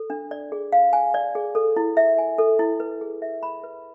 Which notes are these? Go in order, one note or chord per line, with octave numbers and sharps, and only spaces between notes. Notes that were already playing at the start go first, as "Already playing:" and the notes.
Already playing: A4
D4
D5
G#4
F5
G#5
D5
G#4
A4
E4
E5
G#5
A4
E4
B4
G#4
E5
B5
B4